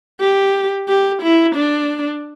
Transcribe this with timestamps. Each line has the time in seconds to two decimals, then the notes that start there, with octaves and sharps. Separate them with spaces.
0.20 G4
0.88 G4
1.22 E4
1.56 D4